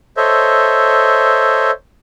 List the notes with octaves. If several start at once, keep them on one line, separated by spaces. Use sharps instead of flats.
A4 C5 C#5 D#5 E5